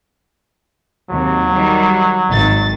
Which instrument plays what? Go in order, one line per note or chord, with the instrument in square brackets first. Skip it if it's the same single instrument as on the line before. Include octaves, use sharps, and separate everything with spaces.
[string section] D#2 C3 [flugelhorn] F#3
[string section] D#3 G3
G#1 D#3 A6